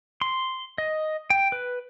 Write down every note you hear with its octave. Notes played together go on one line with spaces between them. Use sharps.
C6
D#5
G5
B4